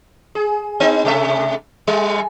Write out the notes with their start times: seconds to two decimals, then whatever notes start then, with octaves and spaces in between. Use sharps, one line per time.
0.35 G#4
0.80 B3 D#4
1.05 C3 A3 E5
1.87 G3